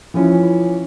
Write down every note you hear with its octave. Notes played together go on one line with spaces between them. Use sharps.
E3 F3 C#4 E4